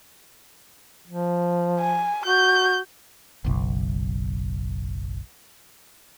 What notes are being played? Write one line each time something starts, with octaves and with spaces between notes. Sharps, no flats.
F3
G#5
F#4 G6
F#1 B1